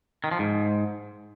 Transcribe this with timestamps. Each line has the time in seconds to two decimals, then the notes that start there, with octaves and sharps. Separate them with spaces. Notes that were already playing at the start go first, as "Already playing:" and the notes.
0.24 D#3
0.31 F3
0.39 G#2